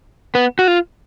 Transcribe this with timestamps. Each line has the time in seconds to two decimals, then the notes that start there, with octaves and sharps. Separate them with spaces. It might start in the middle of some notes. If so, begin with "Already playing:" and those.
0.35 B3
0.59 F#4
0.68 F4